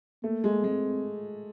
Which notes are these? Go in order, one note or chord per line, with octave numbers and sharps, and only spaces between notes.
A3 A#3
G#3
G#3 C4